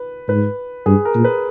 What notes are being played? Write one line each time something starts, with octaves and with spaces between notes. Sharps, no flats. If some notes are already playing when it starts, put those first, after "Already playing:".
Already playing: B4
G#2 B4
G2 G#4
A#4
A#2
B4